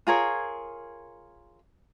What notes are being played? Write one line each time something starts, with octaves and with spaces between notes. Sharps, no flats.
F4 G#4 A#4 C#5